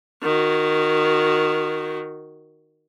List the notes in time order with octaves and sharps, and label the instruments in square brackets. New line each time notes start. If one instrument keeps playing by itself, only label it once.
[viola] D#3 F#4